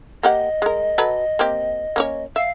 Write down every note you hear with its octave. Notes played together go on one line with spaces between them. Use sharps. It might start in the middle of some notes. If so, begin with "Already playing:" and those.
A#3 G4 D#5 F#5
G#3 A#4
F#3 A4 B4
A#3 C4 G4
A#3 C#4 C#5
E5 F5